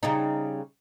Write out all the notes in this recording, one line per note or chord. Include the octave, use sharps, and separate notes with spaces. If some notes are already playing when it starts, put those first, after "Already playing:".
C#3 G3 D#4